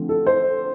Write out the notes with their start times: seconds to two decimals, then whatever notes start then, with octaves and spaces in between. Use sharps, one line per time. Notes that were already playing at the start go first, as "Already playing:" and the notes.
Already playing: D3 F3 A3 C4
0.09 A4
0.27 C5